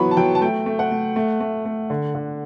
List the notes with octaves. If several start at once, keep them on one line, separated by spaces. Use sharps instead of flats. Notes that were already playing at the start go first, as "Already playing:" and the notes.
Already playing: E3 F#3 B3 B5 C#6
A5
F#3 G5
A5
A3 G5
A3
F#5
A3
A3
A3
A3
D3
D3